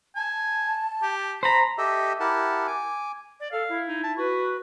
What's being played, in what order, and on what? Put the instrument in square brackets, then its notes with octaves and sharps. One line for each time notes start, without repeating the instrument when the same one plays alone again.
[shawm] G#5 [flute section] A5
[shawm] G4
[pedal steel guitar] C5 A#5 [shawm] B5
[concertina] G4 A4 D#5 E5
E4 G4 A#4 F#5 A5
G#5 D6
[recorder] D5
[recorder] A4 [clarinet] F5
[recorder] E4
[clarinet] D#4
A5
[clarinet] F#4 [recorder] B4